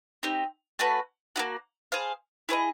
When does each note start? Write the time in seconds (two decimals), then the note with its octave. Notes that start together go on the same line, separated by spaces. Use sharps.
0.23 C4 D#4 G4
0.79 A3 C#4 F#4 B4
1.36 A#3 D#4 F#4
1.92 G#4 C5 F5
2.49 E4 G#4 C5 D#5